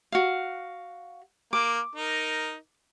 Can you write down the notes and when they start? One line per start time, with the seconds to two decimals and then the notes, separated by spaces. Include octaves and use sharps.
0.12 F#4 F5
1.53 A#3 D6
1.95 D#4 A#4